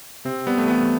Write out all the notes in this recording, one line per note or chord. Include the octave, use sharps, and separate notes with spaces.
C3 C4
G3 B3
A3
E3 B3